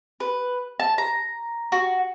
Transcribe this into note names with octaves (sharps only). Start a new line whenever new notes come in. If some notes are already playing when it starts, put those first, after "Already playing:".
B4
A5
A#5
F#4